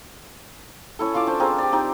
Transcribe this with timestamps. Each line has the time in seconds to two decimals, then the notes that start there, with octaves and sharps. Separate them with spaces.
0.99 C#4 E4 A4
1.14 F4 F5 A5 D6
1.27 C#4 D4 C5
1.40 C4 F4 G#4 A#4
1.58 G4 D5
1.72 C4 D#4 G4 D5